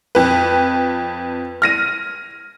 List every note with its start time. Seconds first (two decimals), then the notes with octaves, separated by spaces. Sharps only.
0.15 F2 B4
1.62 F6 A#6 D#7